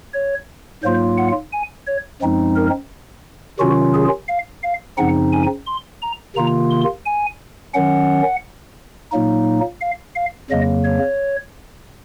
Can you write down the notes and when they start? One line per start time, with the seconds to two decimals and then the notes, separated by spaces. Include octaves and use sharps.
0.14 C#5
0.83 G#2 F#3 A#3 F4 C5
1.18 F#5
1.52 G#5
1.87 C#5
2.22 F#2 F3 G#3 C4 D#4
2.56 A#4
3.59 C3 D#3 F#3 C#4 F4 F#4
3.94 G#4
4.28 F5
4.63 F5
4.98 F#2 C#3 F3 C4 D#4 F#5
5.32 G#5
5.67 C6
6.02 A#5
6.36 C3 D#3 A#3 F4 A#5
6.71 C6
7.05 G#5
7.74 D#3 F#3 C#4 F#5
9.12 A#2 F#3 A#3 D#4
9.81 F5
10.16 F5
10.50 F2 C#3 F#3 A#3 D#5
10.85 C#5